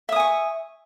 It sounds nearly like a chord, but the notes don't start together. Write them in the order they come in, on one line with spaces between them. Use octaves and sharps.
E5 D#6 G#5 C#6